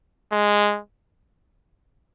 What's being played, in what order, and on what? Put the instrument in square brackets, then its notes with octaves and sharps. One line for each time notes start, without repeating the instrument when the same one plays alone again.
[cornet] G#3